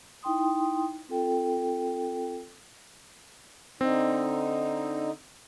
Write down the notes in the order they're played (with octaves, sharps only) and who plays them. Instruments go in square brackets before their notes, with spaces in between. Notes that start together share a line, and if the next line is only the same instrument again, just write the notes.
[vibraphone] D#4 E4 G5 C6 D#6
C4 F4 A4 G5
[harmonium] D3 D#4 [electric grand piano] C4